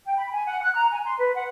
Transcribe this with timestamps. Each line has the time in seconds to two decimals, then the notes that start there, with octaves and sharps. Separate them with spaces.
0.06 G5
0.18 B5
0.32 G#5
0.46 F#5
0.62 F#6
0.76 A#5
0.92 G#5
1.05 C6
1.18 B4
1.34 F#5